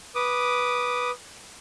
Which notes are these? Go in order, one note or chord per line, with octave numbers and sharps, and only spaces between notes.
B4 D6 D#6